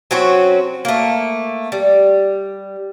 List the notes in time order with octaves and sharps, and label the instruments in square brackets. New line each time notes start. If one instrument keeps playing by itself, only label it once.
[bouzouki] F#3 C4 C#4 F#4
A3 A#3
G3